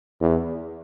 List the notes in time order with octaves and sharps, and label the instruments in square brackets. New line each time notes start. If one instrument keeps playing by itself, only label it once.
[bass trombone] E2